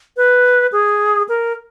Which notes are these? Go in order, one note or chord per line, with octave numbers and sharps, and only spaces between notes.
B4
G#4
A#4